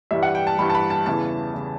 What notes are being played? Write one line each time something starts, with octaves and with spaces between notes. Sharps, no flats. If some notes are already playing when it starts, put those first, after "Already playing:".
G2 E3 G3 E5
F#5
G5
A5
G2 E3 G3 B5
A5
B5
A5
E2 C#3 E3 A5
C#3 E3